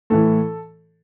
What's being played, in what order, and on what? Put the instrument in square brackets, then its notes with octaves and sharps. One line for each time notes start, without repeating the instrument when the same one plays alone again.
[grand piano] A2 E3 A4